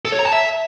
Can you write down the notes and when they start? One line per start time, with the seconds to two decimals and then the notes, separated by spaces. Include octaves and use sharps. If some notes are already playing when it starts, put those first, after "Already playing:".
0.05 A4
0.12 C#5
0.19 A#5
0.26 A5
0.33 E5